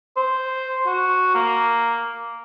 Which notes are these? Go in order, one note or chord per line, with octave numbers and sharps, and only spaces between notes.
C5
F#4
A#3